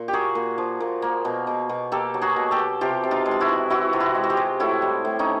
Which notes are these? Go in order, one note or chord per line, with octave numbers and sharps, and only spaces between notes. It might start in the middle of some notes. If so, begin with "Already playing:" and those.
Already playing: A#2
G4
A#3 F#4 G#4
A#2
F3
A#2
A#3
B2
B2
B2
A#3 G4 A4
F#3
F#4 G#4
B2
G4 A4
B2
C3 F4 G4
C3
D#4 F4
G#3
F4
E4 F#4
E3
E3 E4 F#4
C3 F4
E4 F#4
G#3
F#4
F4 G4
G#3
A2 E4 F#4
G3
A2
C#4 D#4